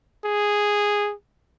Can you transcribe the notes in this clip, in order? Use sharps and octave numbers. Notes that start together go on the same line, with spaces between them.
G#4